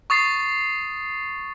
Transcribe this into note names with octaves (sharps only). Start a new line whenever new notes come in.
C#6 D#6 A6 C7